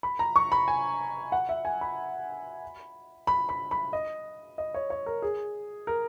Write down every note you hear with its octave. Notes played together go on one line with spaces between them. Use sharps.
B5
A#5
C#6
B5
G#5
F#5
E5
G#5
B5
B5
B5
B5
D#5
D#5
C#5
C#5
A#4
G#4
A#4